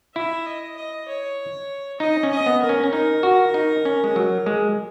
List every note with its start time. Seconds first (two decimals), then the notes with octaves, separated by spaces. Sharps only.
0.15 E4 E5
0.46 D#5
0.77 D#5
1.08 C#5
2.00 D#4 D#5
2.23 C#4
2.31 D#5
2.46 B3
2.62 A#4
2.69 C#4
2.84 C#4
2.93 D#4 A#4
3.23 F#4
3.54 D#4
3.85 C#4
4.04 G#3
4.16 F#3
4.46 G#3